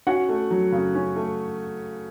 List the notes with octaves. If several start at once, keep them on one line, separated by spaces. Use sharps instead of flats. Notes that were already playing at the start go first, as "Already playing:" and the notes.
C#4 F#4 F#5
A3
F#3
C#3
C#4
A3